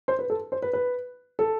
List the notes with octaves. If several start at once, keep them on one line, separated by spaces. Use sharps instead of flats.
C5
B4
A4
C5
B4
B4
A4